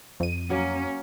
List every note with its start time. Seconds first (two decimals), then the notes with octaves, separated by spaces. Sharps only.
0.20 F2 D#7
0.50 F#3 A#3 C#4